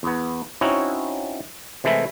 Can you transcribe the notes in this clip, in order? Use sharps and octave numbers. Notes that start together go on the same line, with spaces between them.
E2 B3
C4 C#4 D#4 E4 F#4 C#5
C3 E3 G#3 A3 E4